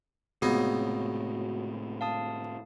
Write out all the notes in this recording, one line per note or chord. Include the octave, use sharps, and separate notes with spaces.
C#2 A2 C3 B3 D#4 F#4
F5 A5 D#6